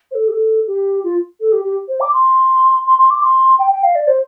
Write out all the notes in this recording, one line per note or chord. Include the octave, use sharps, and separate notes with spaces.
C5
A4
G4
A4
G4
F4
A4
G4
G4
C5
D6
C6
C6
C6
D6
C6
G5
G5
F5
D5
C5